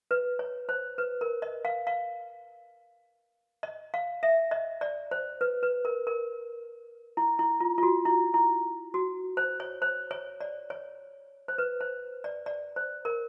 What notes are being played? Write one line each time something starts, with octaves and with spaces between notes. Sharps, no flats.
B4
C#5
C5
B4
A#4
D#5
F5
F5
D#5
F5
E5
D#5
D5
C5
B4
B4
A#4
A#4
E4
E4
F4
F4
F#4
E4
E4
F#4
C5
C#5
C5
C#5
D5
C#5
C5
B4
C5
D5
D5
C5
A#4